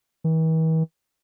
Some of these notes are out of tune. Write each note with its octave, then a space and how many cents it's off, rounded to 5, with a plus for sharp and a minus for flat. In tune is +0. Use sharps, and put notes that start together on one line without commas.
E3 -45